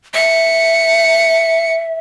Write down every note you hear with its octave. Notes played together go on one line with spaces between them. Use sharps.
E5 C#7